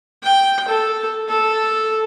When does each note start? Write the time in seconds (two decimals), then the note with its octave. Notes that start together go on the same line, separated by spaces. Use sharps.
0.23 G5
0.68 A4
1.28 A4